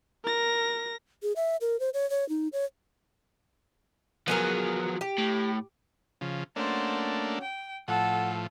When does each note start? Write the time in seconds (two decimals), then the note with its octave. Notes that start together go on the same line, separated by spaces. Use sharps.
0.24 A#4 A#6
1.23 G#4
1.36 E5
1.61 A#4
1.80 C5
1.94 C#5
2.10 C#5
2.29 D#4
2.53 C#5
4.28 F3 F#3 B3 G#4 A#4
5.01 G4
5.18 A2
6.21 C#3 F3
6.56 A3 A#3 C#4 D4 F#4 C5
7.41 G5
7.88 A2 F3 A4 F#5